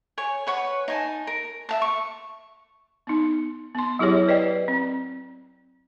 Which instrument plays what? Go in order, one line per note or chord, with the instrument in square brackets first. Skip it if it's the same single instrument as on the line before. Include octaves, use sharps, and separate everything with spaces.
[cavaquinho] C#5 G#5
B4 C#5 F#5 C#6
D#4 G#5 A5
A#4
E5 F5 A5
C#6
[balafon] B3 D#4
B3 C6
F#3 E4 G4 G#4 C#5
B4 D5 D#5 G5
C4